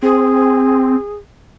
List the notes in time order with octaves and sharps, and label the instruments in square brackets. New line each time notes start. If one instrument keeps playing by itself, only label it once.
[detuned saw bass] C4 [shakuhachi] G#4